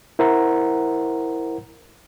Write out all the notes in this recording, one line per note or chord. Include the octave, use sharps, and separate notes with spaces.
E4 A#4 C5 F#5 A#5